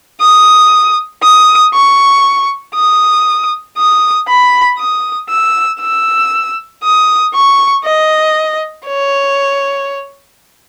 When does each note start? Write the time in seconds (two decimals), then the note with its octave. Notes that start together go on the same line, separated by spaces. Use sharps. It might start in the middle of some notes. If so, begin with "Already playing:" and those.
0.21 D#6
1.23 D#6
1.74 C#6
2.75 D#6
3.78 D#6
4.28 B5
4.79 D#6
5.30 E6
5.81 E6
6.84 D#6
7.34 C#6
7.85 D#5
8.87 C#5